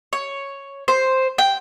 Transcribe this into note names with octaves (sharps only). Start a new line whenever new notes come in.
C#5
C5
G5